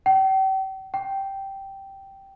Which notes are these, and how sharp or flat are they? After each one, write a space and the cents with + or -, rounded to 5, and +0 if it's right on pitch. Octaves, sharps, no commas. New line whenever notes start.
G5 -40
G5 -10